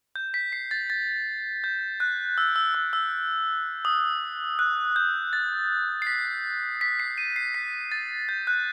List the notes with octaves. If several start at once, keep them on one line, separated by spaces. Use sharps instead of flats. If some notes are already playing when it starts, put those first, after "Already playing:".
G6
B6
C7
A6
A6
G6
F#6
E6
E6
E6
E6
D#6
F#6
G6
A6
C7
B6
B6
C7
D#7
C7
B6
A6
G6
F#6